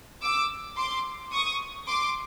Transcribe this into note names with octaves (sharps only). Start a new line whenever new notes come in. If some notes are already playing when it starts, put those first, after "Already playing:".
D6 E6
C6 D6
C#6 D#6
C6 D6